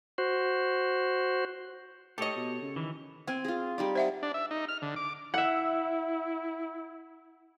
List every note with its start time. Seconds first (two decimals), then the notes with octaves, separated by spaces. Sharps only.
0.18 F#4 C5
2.18 A2 G4 A4 C#5 D#5
2.36 B2
2.62 C#3
2.76 D#3 E3
3.27 C4 G#5
3.45 F4 G#4
3.78 G3 D#4 D5
3.95 C5 E5 F#5
4.23 D4
4.34 E5
4.51 D#4
4.68 F6
4.82 D3
4.96 D6
5.34 E4 E5 F#5